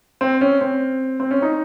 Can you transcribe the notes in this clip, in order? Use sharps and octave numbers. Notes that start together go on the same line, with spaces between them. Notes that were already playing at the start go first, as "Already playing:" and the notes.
C4
C#4
C4
C4
C#4
D#4